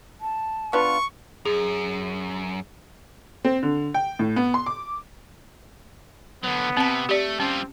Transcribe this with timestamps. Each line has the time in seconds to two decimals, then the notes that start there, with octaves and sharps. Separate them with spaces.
0.21 A5
0.73 B3 D4 F4 C#6
1.45 F#2 G#4
3.45 C4
3.63 D3
3.94 G5
4.19 A2
4.36 B3
4.54 C6
4.66 D6
6.44 D3 F#3 B3
6.77 C3 C4 A5
7.09 A3 G4 D5
7.40 G3 C4 C#4 F4